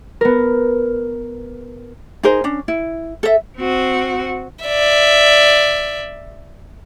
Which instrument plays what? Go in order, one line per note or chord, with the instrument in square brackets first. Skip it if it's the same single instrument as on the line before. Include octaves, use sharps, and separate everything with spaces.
[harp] B3 A#4
[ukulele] D#4 G#4 A#4 C5
C#4 D4
E4
A4 E5
[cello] C4 F#4
[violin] D5 E5